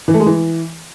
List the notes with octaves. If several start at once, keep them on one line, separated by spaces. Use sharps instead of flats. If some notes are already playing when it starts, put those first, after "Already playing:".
E3
A3
G#3
E3